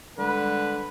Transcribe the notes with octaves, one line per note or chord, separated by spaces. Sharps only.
D3 G3 G#3 B4